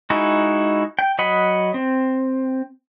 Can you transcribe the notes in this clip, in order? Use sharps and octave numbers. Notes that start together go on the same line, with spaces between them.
G#3 D#4 E4 F#4
G5
F#3 D#5 F#5 B5
C4